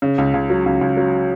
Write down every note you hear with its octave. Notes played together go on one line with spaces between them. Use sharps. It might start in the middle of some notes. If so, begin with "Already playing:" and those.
C#3
C#2
C#2
F#3
C#2
C#2
F#3